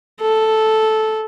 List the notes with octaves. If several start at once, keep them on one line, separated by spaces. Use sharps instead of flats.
A4